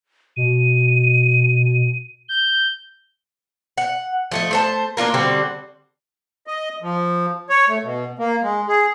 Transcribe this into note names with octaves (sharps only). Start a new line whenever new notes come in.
B2 D#7
G6 G7
F#5
F3 A3 D#5
A3 C5 A5
A#3 D4 F4 A#4
D3 G3 C4 F#4
D#5
F3
C#5
A3
B2
A#3
G#3
G#4